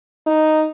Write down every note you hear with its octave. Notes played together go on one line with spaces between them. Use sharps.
D#4